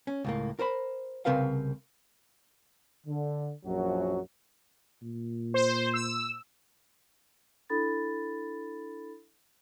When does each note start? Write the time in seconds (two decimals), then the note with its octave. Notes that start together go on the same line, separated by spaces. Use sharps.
0.07 C#4
0.25 C#2 A2 A#3
0.59 A#4 C5 B5
1.25 C2 C#3 C4 A#4 B4 F5
3.07 D3
3.66 A#1 F#2 F3 F#3 F#4
5.02 A#2
5.54 C5
5.94 E6
7.70 D4 E4 A4 B5 A6